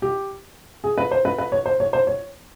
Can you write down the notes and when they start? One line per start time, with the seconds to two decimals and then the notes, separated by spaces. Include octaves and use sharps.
0.02 G4
0.84 G#4
0.98 B4
1.11 C5
1.25 B4
1.38 B4
1.52 C#5
1.66 C5
1.80 C#5
1.93 C5
2.07 C#5